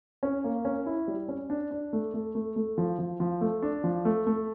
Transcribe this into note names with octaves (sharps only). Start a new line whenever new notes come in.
C#4
A#3
C#4
E4
G3
C#4
D4
D4
A3
A3
A3
A3
F3
F3
F3
A3
D4
F3
A3
A3